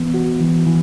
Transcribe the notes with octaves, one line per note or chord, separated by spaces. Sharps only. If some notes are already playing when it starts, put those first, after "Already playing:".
Already playing: E3 B3
F#4
E3
E3